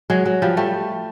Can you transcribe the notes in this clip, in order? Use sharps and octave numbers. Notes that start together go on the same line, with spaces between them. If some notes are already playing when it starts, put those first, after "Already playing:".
F#3 G#3
F#3
F3 G3
G3 A3